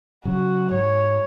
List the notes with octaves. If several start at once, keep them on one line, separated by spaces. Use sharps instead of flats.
C#3 F#3 F#4
G#2 C#5